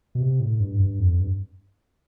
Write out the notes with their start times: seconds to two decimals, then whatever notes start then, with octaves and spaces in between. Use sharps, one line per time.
0.15 B2
0.21 C3
0.40 A2
0.60 G2
0.80 G2
0.99 F2
1.20 G2